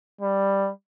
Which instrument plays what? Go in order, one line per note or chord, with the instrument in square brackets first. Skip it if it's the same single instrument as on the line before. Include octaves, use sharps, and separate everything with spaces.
[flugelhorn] G3